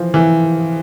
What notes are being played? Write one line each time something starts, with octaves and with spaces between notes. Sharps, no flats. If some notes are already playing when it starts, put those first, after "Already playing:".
Already playing: E3 F3
E3